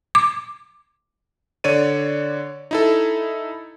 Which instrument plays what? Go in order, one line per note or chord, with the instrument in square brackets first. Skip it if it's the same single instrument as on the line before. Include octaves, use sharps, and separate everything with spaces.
[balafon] D6
[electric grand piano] D3 C#5 D5 D#7
D#4 E4 A4